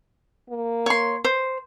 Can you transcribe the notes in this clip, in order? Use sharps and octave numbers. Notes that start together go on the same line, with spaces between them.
A#3
C#5 C6
C5